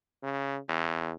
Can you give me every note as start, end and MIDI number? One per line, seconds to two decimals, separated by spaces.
0.23 0.59 49
0.68 1.13 40